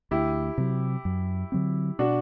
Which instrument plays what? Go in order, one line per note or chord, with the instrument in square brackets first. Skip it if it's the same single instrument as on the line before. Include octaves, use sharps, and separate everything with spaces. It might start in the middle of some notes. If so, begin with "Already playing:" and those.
[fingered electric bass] D2 [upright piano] E4 G4
[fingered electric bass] C3 F#3
F#2
D3 F#3 C4
[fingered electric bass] B2 [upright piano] D4 F#4